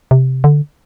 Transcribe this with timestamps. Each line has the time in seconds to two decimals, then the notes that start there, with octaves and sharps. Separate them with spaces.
0.11 C3
0.44 D3